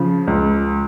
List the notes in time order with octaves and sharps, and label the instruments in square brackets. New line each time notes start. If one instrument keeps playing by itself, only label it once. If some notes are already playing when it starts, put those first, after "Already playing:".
Already playing: [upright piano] C#3 F3
C#2